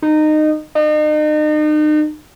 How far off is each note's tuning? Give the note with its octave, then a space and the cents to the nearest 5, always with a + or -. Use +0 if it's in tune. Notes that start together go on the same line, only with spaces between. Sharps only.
D#4 -20
D#4 -40